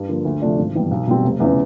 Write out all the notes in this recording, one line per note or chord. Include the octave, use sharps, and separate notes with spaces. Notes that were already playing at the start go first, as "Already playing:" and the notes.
Already playing: G2
D3 F3 A#3
D2
C3 F3 A3 D4
G#1
G2 E3 G3 B3
B1
B2 G3 C4
F1
E2 C#3 E3